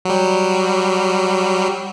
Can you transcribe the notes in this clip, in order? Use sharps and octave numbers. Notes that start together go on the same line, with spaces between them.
F#3 G3